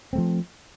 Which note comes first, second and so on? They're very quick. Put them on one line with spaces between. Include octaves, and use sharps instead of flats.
C4 A3 F3